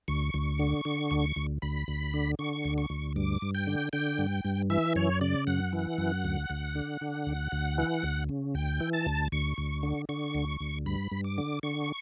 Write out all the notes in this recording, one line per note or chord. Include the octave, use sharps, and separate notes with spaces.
D2 C#6
D2
D3
D3
D2
D2
D2 B5
D2
D3
D3 C#6
D2
C#6
D2
G2 D6
G2
G5
D3
D3 G5
G2
G2
E3 E5
F#2 C#5
C#3 D5
F#2 F#5
E3
F#2
D2
D2
D3
D3
D2
D2
E3
D2
C#3
D2 G5
E3
A5
D2
D2 C#6
D2
D3
D3 C#6
D2
D2
G2 B5
G2
D6
D3
D3 C#6